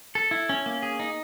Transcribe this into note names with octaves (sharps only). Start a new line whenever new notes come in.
A4
E4
C#4
A#3
G#4
D#4